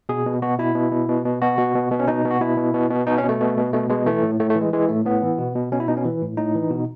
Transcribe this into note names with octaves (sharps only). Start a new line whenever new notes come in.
B2 G#4
B2
B2 F#4
B2 E4
B2
B2
B2
B2
B2 F#4
B2
B2
B2
C#4
B2 D#4
B2
F#4
B2 E4
B2
B2
B2
B2 D#4
C#4
B2
A3
B2
B2
B2 A3
B2 G#3
E3 A3
A2
A2 A3
A3
E3
G#3
E3 G#3
A2 A3
A2 B3
E3
B2
B2
B2 C#4
E4
B2 D#4
C#4
E3
A2
A2 D#4
E3
B2